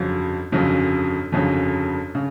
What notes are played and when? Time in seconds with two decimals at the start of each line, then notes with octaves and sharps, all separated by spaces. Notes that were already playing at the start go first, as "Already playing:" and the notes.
Already playing: G1 F2 C#3 F#3
0.52 G1 F2 C#3 F#3
1.32 G1 F2 C#3 F#3
2.15 C#3